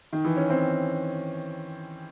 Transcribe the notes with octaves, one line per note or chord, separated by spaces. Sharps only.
D#3
E3
C#4
C4